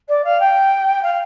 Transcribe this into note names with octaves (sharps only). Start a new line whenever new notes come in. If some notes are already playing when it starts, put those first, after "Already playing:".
D5
F5
G5
F5